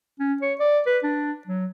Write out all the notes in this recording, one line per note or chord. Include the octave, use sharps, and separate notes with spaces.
C#4
C#5
D5
B4
D4
F#3